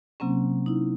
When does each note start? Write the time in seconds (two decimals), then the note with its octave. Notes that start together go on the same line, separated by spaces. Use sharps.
0.20 C3 F#3 A#3 C4 C#4
0.66 D#4 E4